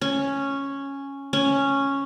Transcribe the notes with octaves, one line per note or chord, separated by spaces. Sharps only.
C#4
C#4